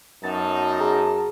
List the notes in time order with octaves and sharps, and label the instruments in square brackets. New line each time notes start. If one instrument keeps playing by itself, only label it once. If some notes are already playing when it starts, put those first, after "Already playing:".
[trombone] F#2 [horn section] F#3 B3 D#4 [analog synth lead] A5
[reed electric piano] G#4 A#5